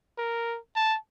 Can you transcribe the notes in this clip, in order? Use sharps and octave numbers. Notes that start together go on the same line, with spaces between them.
A#4
A5